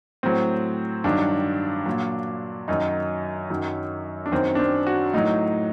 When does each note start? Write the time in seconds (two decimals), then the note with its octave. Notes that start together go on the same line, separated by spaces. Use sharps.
0.23 A2 F#3 C4
1.04 G2 D#3 F#3 D4
1.86 A#2 F#3
2.68 F#2 D#3 F#3 D#4
3.50 F#2 D#3 F#3
4.26 D4
4.31 F#2 D#3 F#3 C4
4.55 D4
4.59 C4
4.87 F#4
5.14 A2 F#3 D#4